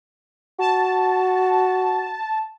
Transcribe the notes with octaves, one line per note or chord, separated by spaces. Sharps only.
F#4 A5